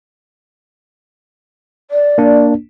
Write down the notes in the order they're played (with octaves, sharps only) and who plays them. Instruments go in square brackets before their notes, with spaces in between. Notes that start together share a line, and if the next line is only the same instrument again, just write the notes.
[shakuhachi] D5
[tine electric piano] A#3 D4